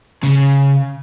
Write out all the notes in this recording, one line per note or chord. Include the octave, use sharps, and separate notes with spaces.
C#3